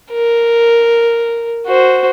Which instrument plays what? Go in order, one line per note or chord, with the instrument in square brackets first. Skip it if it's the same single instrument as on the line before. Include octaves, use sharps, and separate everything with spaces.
[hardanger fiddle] A#4
F#4 C5